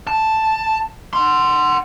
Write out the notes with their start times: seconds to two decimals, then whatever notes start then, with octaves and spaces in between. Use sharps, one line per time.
0.07 A5
1.13 F#5 C6